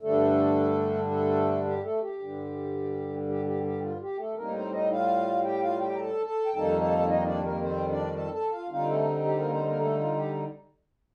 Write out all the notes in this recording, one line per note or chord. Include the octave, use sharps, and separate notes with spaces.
G2 D3 G3 A3 D4 A4
A3 A4
G4
A3 A4
G4
G2 D3 G3
G4
G4
G4
F4
G4
A3 A4
A2 G3 A#3 C4 D#4 A#4
C4 C5
D#4 D#5
F4 F5
G4 G5
F4 F5
G4 G5
A#5
A4 A5
A4 A5
G5
F2 D#3 G3 A#3 D#4 A4 A5
A4 A5
D#4 D#5
D4 D5
A#3 A#4
C4 C5
D4 D5
A4 A5
A4 A5
F4 F5
D3 G3 C4 D#4 F4 F5
A3 A4
G4
A#3 A#4
C4 C5
A#3 A#4
A3 A4
F4
G4